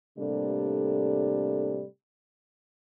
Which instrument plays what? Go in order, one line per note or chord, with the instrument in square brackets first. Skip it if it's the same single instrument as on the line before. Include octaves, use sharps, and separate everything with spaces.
[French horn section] A2 C3 G3 A#3 D4 A4